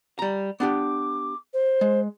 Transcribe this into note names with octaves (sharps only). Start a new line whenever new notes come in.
G3 A#5
B3 D4 G4 D6
C5
G#3